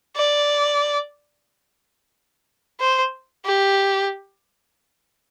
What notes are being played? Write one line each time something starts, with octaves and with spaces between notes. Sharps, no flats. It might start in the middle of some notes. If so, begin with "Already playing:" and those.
D5
C5
G4